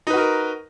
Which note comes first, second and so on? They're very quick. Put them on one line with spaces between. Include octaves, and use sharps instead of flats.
D#4 B4 F#4 A#4